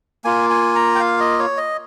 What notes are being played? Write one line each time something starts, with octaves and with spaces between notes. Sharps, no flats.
A#3 F4 G#5
G#5
A#5
G5
F5
D#5
C#5
D#5